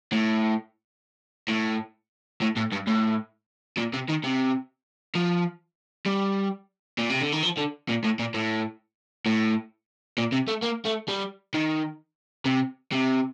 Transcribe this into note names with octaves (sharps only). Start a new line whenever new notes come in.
A2
A2
A2
A2
G2
A2
A#2
C3
D#3
C3
F3
G3
A#2
C3
D3
D#3
F3
D3
A#2
A2
A#2
A2
A2
A#2
C3
A3
A#3
A3
G3
D#3
C3
C3